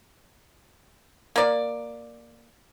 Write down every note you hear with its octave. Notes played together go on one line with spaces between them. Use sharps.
A#3 D5